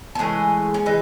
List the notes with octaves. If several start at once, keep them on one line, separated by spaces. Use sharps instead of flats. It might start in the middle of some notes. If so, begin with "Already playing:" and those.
A4
E3 G#3 A3 C#4 G#4
C#4
E3 D#4